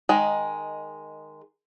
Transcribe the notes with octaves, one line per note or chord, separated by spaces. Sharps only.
D#3 G#3